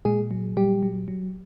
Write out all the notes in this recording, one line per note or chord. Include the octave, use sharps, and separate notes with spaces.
A#2 G#3 G#4
F#3
A#2 G3 G4
F#3
F#3